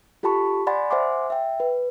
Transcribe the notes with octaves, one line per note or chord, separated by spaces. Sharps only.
F4 G4 A4 A5 B5 C#6
D5 F#5 G#5 B5 C6 A6
C5 E5 F#5 G#5 C6 D6
E5 G5
B4